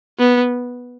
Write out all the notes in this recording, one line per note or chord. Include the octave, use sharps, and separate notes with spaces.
B3